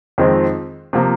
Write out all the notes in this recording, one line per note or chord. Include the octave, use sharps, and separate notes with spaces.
F2 D#3 G#3 C4 F4
C3 F3 A#3